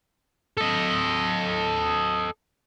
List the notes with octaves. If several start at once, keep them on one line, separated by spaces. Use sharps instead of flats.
A4 D#5